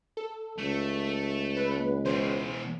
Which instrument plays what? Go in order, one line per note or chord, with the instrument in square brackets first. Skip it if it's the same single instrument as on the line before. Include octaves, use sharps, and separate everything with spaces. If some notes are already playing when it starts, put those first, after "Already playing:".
[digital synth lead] A4
[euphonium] C#2 [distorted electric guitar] A3
[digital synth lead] B4
[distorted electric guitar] E2 B2 [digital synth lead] C5